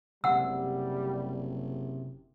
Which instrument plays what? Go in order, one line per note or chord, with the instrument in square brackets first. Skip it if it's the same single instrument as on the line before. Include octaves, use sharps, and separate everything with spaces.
[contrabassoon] F#1 [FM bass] C3 [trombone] G3 [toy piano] F#5 E6